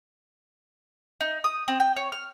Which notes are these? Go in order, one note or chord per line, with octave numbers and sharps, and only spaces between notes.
D#4
D#6
C4
G5
C#5
F6